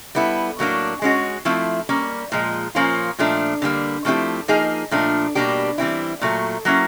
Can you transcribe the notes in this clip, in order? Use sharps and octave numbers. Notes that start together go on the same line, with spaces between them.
G3 B3 E4 A4
A2 F#3 A#3 D4
G#3 C#4 F#4
F3 A3 C4 E4
G3 A#3 C#4
A#2 F3 G#3
A#2 F3 A#3 C#4 F4
A#2 F3 A3 D4
D3 G3 A#3
F3 A3 C4 E4 G4
F3 A#3 D#4 G#4
A#2 F3 A3 D4
B2 G3 A#3 D4 G4
E3 G3 C4 E4
A#2 F#3 A3
F#3 A#3 C#4 E4